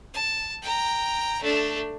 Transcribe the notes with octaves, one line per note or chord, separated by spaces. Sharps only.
A5
G5 A#5
A3 D4